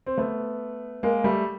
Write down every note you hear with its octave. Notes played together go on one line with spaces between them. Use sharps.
C4
A3 B3
G#3 A#3
G3 A3